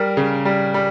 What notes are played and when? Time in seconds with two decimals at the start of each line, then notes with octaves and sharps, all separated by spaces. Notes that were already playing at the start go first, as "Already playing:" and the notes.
Already playing: G3 A#4
0.17 C#3
0.45 G3
0.74 G3